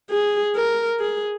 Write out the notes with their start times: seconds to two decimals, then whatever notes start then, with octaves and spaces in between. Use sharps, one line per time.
0.10 G#4
0.55 A#4
1.00 G#4